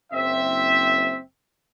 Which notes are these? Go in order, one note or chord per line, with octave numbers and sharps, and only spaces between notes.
F#1 C4 E5